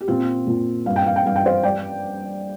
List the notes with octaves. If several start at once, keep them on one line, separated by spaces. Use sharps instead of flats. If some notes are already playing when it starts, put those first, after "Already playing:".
G4
A#2 C4 F4
A#2
G2 F5
G5
F5
G5
G2 F5
G5
C5 F5
G3 D5 G5